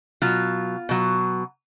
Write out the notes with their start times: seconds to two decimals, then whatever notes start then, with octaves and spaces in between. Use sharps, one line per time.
0.22 B2 F#3 F4
0.89 B2 F#3